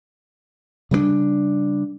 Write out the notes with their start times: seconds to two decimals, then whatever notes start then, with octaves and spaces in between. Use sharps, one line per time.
0.91 C#3 G3 G#3 D4